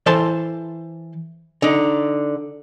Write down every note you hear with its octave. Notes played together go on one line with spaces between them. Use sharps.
E3 A4 C5 A5 C6
D3 D#4